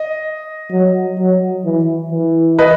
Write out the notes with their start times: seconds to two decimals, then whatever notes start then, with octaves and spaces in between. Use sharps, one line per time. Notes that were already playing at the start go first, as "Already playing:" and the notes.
Already playing: D#5
0.71 F#3
1.18 F#3
1.65 E3
2.12 E3
2.59 B4 D#5